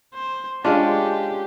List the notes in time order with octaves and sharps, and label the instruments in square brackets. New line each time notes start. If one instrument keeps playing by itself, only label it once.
[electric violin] C5
[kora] G#3 C#4 [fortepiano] D4 F4 [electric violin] G4